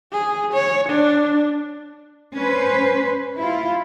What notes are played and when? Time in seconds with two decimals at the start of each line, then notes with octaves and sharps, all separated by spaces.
0.12 G#4
0.53 C#5
0.89 D4
2.37 C#4 B4 C5
3.36 E4 F4